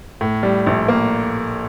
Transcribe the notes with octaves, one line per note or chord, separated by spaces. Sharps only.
A2
G3
A#1
A#3